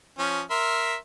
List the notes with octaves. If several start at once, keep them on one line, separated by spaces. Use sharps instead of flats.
F3 C#4
A#4 E5 C6